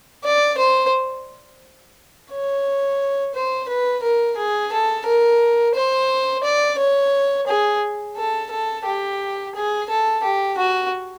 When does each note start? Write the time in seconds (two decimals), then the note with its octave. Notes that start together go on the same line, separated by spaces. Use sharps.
0.24 D5
0.58 C5
2.31 C#5
3.35 C5
3.69 B4
4.03 A#4
4.37 G#4
4.73 A4
5.06 A#4
5.75 C5
6.44 D5
6.78 C#5
7.47 G#4
8.17 A4
8.51 A4
8.86 G4
9.55 G#4
9.90 A4
10.23 G4
10.57 F#4